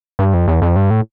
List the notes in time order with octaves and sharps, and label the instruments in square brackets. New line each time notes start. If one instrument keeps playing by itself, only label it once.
[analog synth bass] G2
F2
E2
F2
G2
A2